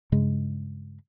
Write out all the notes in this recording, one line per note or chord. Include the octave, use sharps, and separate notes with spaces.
G2 C#3 G#3